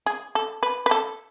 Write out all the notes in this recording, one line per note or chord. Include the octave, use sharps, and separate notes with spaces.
G#4
A4
B4
B4
A4